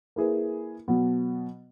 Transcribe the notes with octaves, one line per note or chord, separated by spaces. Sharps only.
A#3 E4 G#4 B4
B2 F#3 B3